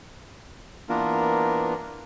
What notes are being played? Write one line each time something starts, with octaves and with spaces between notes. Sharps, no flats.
E3 A#3 B3 D4 F4 A#4